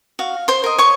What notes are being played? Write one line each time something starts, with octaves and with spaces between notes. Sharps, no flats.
F#4 F5
C5 C6
A#4 D#5
C#5 C#6